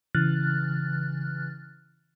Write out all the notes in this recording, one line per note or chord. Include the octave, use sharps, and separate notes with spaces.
C#3 E3 F6 F#6 A6